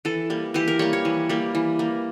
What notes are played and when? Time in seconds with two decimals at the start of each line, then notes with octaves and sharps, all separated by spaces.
0.05 E3 A4
0.30 G3 A#3
0.54 E3 G4
0.68 A#4
0.79 G3 A#3 C#5
0.93 C#5
1.05 E3
1.29 G3 A#3
1.55 E3
1.79 G3 A#3